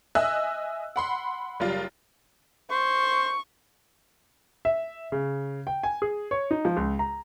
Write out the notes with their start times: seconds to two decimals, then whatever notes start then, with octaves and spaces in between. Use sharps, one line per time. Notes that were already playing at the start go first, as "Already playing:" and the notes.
0.15 D#5 E5 G#5 E6 F#6
0.96 F#5 B5 C6
1.60 F#1 G3 F4
2.70 C5 C#6
4.65 E5
5.12 C#3
5.67 G5
5.83 G#5
6.02 G#4
6.31 C#5
6.51 D#4
6.65 F3
6.77 C#2
6.99 A#5